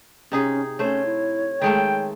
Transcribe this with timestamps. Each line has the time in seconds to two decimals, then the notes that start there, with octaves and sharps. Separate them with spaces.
0.32 C3 C#4 D#4 G#4
0.79 A3 C#4 C5 C#5
1.05 E4
1.62 D#3 G#3 A3 G5